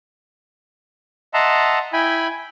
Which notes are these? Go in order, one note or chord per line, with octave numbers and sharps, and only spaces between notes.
D#5 E5 F#5 A5 A#5 C6
E4 G5 G#5 B5